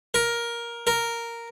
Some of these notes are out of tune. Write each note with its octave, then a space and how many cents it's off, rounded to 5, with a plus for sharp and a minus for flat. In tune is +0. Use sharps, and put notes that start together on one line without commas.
A#4 +10
A#4 -5